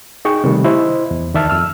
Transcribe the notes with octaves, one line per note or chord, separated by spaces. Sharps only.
D#4 G#4 G5 C#6
C3 D#3 G3 A3
E4 C5 D#5
E2
D2 D#3 D5 E5 A5 F6
F2 E6 F6